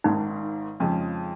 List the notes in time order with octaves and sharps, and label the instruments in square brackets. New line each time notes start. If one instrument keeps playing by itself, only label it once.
[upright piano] G#1 G#2 D#3 [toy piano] D#4
[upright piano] F2 C#3 F3 G#3